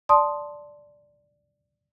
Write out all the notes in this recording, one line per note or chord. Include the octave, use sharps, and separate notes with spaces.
D5 A5 C6 D#6